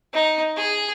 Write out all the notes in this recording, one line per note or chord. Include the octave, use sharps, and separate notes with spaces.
D#4
G#4